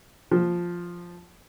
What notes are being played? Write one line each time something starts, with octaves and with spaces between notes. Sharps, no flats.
F3